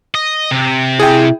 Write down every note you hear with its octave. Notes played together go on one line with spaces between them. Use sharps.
D#5
C3
E4 G#4 G5